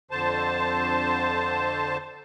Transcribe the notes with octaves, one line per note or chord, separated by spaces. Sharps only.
F2 D3 C5 A5